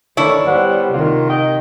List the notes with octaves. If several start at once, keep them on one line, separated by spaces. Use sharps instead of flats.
D#3 A3 D4 E4 C#5
G3 B3 C5 F#5
C3 D#3 A#3 F4
D#5 G5